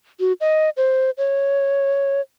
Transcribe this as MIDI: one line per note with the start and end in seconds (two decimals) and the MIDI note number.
0.20 0.33 66
0.41 0.69 75
0.77 1.10 72
1.18 2.21 73